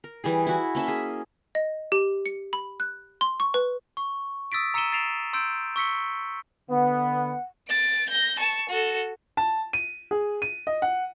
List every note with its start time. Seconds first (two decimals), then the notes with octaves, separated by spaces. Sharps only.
0.04 A#4
0.24 E3 G3 G#4
0.47 E4 F#4
0.75 A#3 C#4 E5 A5
0.88 G#4
1.55 D#5
1.92 G4
2.26 C#7
2.53 B5
2.80 F#6
3.21 C6
3.40 C#6
3.54 B4
3.97 C#6
4.52 D#6 E6 A6 B6 D7
4.74 A#5 E6 C#7 D#7 E7 G7
4.92 A6 C7 D7 E7 F7
5.33 C6 E6 G6 D7
5.76 C#6 E6 B6 C#7 G7
6.70 D3 B3 F#5
7.69 A6 D7
8.09 G6 A#6
8.39 A5 C#6
8.69 F#4 A4
9.37 A5
9.73 D#7
10.11 G#4
10.42 D#7
10.67 D#5
10.82 F#5